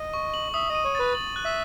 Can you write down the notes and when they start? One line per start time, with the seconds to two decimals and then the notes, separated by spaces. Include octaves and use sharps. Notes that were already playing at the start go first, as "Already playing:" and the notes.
Already playing: D#5
0.14 C#6
0.34 F#7
0.54 E5 D#6
0.70 D#5
0.75 D#7
0.85 C#5
0.95 B4 A6
1.15 F#7
1.36 F#6
1.45 E5